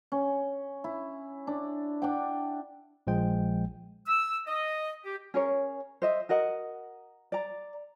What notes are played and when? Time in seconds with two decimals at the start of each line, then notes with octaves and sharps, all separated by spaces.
0.12 C#4
0.84 E4
1.47 D4
2.02 D4 F#5 G5
3.07 A#1 F3 G#3 G5
4.07 E6
4.47 D#5
5.04 G4
5.34 C#4 G#4 A#4 C#5
6.02 C5 D#5 E5
6.29 F#4 A#4 D#5 F#5
7.32 D5 A#5